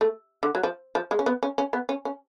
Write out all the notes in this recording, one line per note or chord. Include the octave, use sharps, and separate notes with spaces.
A3
D3
F#3
F3
F3
G#3
C#4
B3
C#4
C#4
B3
C#4
C#4